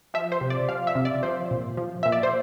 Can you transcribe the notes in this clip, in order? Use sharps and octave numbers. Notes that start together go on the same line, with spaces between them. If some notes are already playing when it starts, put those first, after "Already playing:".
F3 E5
C5
C3
D5
F3 F5
E5
C3
D5
F3 C5
A#2
F3
A#2 E5
D5
C5